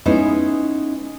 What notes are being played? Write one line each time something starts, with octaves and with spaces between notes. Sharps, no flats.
G#3 B3 C#4 D#4 E4